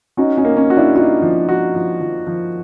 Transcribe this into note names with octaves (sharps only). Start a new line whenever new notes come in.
C#4 D#4 F#4
C#4 D#4
A#3
C#4 D#4
F#4
D4 E4
D#4 F4 F#4
F3
F#4
F3
F3
F3